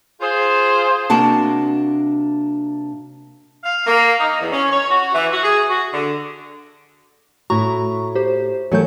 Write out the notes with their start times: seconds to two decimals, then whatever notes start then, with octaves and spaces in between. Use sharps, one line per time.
0.21 F4 G#4 C5
1.10 C3 A#3 D4 F#4 A5
3.64 F5
3.87 A#3
4.20 D#4
4.39 E2
4.51 C#4
4.71 C#5
4.90 F#4
5.14 E3
5.31 F#4
5.43 G#4
5.69 F#4
5.93 D3
7.50 A2 E4 F#4 A#5 C#6
8.15 G4 C5
8.72 E3 F#3 A3 A4 A#4 G6